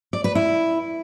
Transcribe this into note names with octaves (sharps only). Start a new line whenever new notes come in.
D5
B4
E4